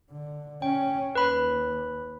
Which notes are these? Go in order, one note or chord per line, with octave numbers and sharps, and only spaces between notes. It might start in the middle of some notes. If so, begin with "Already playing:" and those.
D3
C#4 G5
D#2 B4 B5